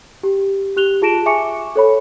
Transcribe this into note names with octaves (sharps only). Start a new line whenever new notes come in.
G4
G4 F#6 F7 G7
F4 G#4 A5 A#6 D7 E7
E5 G#5 C#6 D6 C#7
A4 C#5 B5